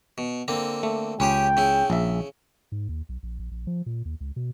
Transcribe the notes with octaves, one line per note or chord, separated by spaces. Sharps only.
B2
D3 A#3 C4
A3
C#2 C#4 G4 G#4 G5
C#3 E4
A#1 E5
G#2
D#2
B1
A#1
A#1
A#1
F3
A#2
D#2
C#2
B2